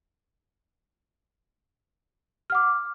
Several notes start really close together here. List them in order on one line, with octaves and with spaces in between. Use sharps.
F6 F#5 D6